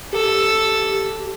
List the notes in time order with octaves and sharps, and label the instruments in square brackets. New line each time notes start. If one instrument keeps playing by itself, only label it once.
[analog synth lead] G4 [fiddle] A4 E6